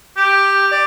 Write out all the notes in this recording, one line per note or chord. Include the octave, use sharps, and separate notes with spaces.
G4
D5